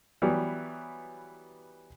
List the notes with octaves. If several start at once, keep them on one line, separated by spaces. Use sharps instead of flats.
E3 F#3 G3 B3